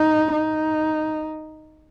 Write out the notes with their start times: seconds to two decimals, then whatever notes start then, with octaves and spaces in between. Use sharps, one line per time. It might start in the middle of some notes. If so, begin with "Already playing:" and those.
Already playing: D#4
0.32 D#4